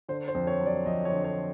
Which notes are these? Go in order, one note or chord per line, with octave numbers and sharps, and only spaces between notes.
D3 C5
C5
F2
C#5
F#3
D5
F2 D#5
C#5
D3
C#5